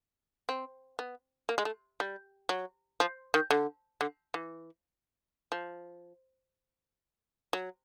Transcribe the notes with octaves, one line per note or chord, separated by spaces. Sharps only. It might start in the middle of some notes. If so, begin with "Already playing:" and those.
C4
B3
A#3
G#3
A3
G3
F#3
F3
D#3
D3
D3
E3
F3
F#3